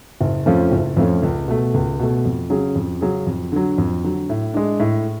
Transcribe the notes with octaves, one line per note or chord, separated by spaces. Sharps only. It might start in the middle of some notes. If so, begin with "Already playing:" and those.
F#1
F2 F3 A3 C#4
F#1
F2 F3 A3 C#4
C#2
B2 A3
C#2
B2 A3
F2
C#3 F#3 C#4 G#4
F2
C#3 F#3 C#4 G#4
F2
D3 F#3
F2
D3 F#3
A2
G#3 D4
A2